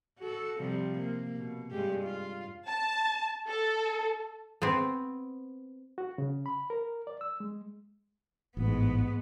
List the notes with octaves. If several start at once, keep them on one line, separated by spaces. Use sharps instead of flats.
F#4 A4
C3 F3 G3
A#3
B2
G2 G#3 G4
F4
A5
A4
B3 C4
F#4
C#3
B5
A#4
D5
E6
G#3
A1 G#2 B3